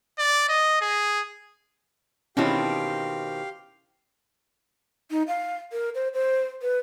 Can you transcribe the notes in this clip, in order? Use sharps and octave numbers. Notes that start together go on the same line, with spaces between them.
D5
D#5
G#4
B2 D#3 C4 C#4 E4 G4 F5
D#4
F5
A#4
C5
C5
B4